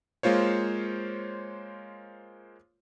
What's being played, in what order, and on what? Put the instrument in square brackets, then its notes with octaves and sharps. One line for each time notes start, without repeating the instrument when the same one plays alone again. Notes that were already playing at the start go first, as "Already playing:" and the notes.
[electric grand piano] G#3 A#3 F4 C5 C#5